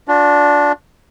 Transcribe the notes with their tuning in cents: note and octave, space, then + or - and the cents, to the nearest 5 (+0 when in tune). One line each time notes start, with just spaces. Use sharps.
D4 -10 F4 +45